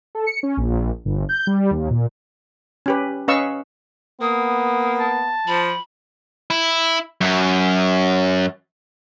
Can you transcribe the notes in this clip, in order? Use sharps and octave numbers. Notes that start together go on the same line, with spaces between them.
A4
C#7
C#4
A#1
G1
G6
G3
D#2
A#2
C#4 G4 B4
C#4 B4 D#5 F5 C#6 E6
A#3 B3 D#6
A5
F3 B5
E4
F#2